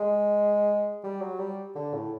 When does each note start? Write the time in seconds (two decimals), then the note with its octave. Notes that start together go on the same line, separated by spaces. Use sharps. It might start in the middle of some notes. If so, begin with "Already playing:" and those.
Already playing: G#3
1.03 G3
1.21 F#3
1.39 G3
1.75 D3
1.94 A2